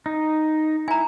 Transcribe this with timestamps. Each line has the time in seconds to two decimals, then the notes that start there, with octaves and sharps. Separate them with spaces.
0.06 D#4
0.88 E4 G#5 A#5